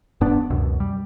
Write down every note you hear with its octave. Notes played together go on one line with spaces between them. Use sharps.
E1 G2 B3 D4
C#2 F#2 B2
G3